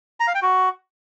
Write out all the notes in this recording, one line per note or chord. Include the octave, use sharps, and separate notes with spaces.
A#5
F5
G5
F#4